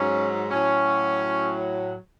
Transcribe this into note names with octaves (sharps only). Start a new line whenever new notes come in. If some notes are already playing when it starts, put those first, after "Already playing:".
Already playing: G#2 F#3 C#4
A2 F#3 C#4